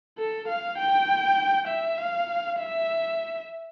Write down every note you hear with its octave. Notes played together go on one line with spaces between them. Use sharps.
A4
F5
G5
E5
F5
E5